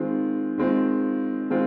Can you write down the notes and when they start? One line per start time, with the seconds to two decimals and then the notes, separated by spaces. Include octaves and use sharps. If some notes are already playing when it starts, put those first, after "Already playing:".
Already playing: D#3 G#3 C4 F4
0.58 D#3 G#3 C4 F4
1.50 D#3 G#3 C4 F4